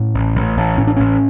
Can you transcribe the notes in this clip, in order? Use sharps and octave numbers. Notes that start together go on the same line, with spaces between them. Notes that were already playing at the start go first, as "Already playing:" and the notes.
Already playing: A2 C#4
A1
A1
A1
A2 C#4
D4
A1 C#4